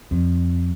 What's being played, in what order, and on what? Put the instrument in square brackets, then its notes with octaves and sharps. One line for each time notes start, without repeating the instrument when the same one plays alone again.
[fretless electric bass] F2